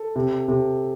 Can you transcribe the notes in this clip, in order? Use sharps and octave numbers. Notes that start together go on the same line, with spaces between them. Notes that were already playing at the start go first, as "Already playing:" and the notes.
Already playing: A4
C3
C3